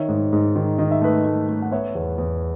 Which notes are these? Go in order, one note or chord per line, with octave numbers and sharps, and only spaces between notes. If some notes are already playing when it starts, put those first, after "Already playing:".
Already playing: D#3 C#5 E5
G#2
G#2
D#3
D#3 D#5
E5
A3 B4 D#5
A3
A3
F#5
B3 C#5 E5
E2
E2